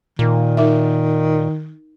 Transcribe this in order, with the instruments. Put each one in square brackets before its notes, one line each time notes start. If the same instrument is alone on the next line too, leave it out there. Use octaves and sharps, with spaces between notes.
[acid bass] A#2 [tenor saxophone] D#3
[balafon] D#4 A#4 E5